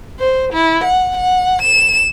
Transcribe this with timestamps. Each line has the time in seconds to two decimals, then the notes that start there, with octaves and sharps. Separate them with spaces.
0.19 C5
0.53 E4
0.84 F#5
1.17 F#5
1.62 E7